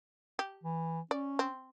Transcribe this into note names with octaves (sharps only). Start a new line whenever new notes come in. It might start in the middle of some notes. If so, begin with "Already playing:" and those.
G4
E3
C#4 D5
C4